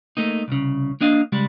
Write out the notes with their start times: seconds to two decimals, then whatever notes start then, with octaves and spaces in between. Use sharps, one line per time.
0.17 A3 A#3 D#4
0.48 C2 C#3
1.01 A#3 D4 D#5 F5
1.32 C#3 G3 G#3